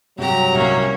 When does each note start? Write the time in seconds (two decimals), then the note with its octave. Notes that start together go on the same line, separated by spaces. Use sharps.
0.18 G2 C3 F#3 G4 A#5
0.54 C2 A#3 C#4